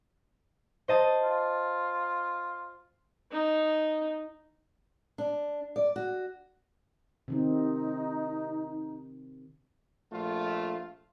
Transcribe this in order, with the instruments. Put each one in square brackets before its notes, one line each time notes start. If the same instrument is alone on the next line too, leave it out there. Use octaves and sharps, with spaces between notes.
[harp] C5 D#5 A5
[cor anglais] F4
[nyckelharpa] D#4
[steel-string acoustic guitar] D4
D5
F#4
[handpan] C3 D#3 C4 [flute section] D#4
[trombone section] A#1 A3 F4